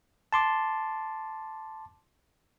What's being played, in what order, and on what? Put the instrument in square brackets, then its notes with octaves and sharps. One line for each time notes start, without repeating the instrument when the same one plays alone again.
[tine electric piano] A5 C6 D6